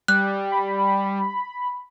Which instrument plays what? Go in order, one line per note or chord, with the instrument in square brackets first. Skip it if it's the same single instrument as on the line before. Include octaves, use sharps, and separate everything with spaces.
[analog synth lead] G3 [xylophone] F#6
[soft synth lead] B5